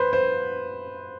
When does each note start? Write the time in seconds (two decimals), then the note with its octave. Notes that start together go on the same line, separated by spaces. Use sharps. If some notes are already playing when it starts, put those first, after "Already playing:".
Already playing: B4 C5
0.13 C5